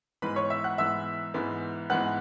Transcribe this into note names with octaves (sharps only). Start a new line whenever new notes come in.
G#2 E3 G#3 B3 B4 B5
C#5 C#6
E5 E6
F#5 F#6
G#2 E3 G#3 B3 E5 E6
G#2 E3 G#3 B3
G#2 E3 G#3 B3 F#5 F#6